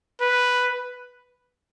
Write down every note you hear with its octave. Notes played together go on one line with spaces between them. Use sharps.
B4